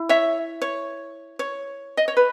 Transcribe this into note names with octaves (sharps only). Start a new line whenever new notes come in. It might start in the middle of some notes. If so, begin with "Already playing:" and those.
Already playing: E4
C#5 E5
C#5
C#5
D#5
C#5
B4